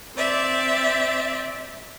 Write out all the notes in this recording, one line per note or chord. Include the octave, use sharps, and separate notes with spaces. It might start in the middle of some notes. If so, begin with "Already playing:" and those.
C4 D5 E5